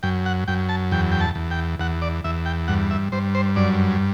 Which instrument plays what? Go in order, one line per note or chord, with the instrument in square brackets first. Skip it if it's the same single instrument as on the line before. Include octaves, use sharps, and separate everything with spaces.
[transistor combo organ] F#2 G5
F#5
F#2 G5
A5
E2 G5
G5
A5
E2
G5
E2 F#5
D5
E2 E5
G5
G2 F#5
E5
G2 C5
C5
F#2 D5